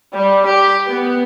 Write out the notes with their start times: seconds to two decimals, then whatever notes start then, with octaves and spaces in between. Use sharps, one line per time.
0.16 G3
0.46 G4
0.88 B3